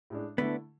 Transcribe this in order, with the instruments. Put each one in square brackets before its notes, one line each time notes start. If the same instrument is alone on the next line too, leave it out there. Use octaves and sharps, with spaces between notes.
[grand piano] A2 G#3 D4
[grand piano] D3 A3 E4 [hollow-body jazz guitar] B3 D4